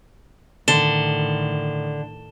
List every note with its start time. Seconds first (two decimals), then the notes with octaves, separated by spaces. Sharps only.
0.68 A2 D3 D#3 E7 G7